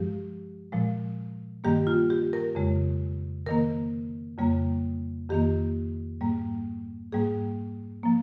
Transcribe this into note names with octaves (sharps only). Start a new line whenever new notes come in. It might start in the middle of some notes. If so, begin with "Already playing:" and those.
Already playing: G2 F3 G#3 G4
A#2 F3 G#3
G2 D#3 G3 A#3 G4
F4
G4
A#4
F2 C#3 G#3
C3 D#3 A#3 A#4
F2 C#3 G3 A#3
F2 D#3 A#3 G4
G#2 G3 A#3
G#2 G3 A#3 G#4
F3 A#3